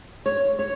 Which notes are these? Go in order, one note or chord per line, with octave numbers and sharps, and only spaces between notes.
C#5
C#5